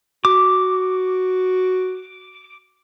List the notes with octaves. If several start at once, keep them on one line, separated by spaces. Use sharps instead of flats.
F#4 D6